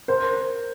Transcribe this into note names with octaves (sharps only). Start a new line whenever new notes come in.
A#4 C5